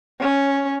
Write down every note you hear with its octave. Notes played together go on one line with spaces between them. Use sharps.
C#4